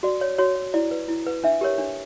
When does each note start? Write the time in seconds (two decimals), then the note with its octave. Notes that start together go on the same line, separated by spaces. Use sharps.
0.03 F#4 D5
0.21 C#5
0.38 F#4 C#5
0.56 C#5
0.74 E4 D5
0.91 B4
1.08 E4
1.26 B4
1.44 D4 E5
1.61 G4 A#4 C#5
1.78 D4